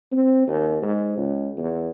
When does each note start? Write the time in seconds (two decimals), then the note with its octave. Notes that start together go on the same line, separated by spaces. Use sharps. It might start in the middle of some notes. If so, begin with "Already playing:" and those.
0.12 C4
0.48 D#2
0.82 G#2
1.17 C#2
1.58 E2